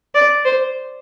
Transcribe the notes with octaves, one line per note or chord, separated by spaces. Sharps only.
D5
C5